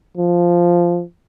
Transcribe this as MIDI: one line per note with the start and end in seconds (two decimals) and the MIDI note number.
0.18 1.03 53